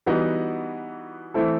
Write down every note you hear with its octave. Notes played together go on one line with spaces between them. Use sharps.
E3 G3 B3 D#4 F#4
E3 A3 C4 E4 A4